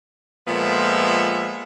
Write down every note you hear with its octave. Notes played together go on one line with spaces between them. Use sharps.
A#2 F3 G#3 B3 A4 E5